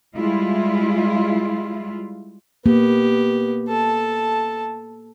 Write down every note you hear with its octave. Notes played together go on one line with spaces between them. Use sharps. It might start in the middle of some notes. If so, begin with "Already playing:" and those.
G3 G#3 E4 F4
A#3 B3 G4
A4 A5